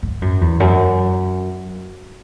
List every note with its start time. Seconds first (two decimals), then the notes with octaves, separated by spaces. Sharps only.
0.03 G#2
0.22 F#2
0.41 E2
0.60 F#2